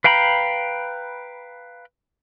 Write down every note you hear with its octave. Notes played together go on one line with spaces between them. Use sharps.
B4 F5 G5 A#5 B5